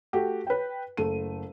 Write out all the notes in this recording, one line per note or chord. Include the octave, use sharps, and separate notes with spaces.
A3 F#4 G4
B4 G5
F#1 A3 D#7